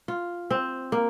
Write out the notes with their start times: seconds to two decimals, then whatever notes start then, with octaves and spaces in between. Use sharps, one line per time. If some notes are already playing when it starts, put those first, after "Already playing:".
0.08 F4
0.51 C4
0.92 A#3